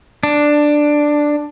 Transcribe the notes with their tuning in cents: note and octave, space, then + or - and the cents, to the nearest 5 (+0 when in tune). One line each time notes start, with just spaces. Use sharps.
D4 +5